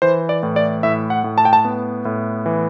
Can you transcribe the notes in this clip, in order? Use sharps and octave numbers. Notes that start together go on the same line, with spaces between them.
E3 C5
D5
A2
D5
A2 E5
F#5
A2
A5
G5
A5
B3
A2
E3